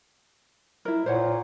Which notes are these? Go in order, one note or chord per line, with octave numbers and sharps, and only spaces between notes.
E4 A#4
A#2 C5 C#5 F#5